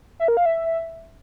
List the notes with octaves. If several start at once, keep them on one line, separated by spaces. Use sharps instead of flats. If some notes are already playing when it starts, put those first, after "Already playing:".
E5
A#4
F5
E5